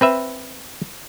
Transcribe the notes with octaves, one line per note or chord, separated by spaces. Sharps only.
C4 B4 E5